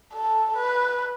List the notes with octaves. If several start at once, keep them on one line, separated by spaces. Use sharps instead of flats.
A4
B4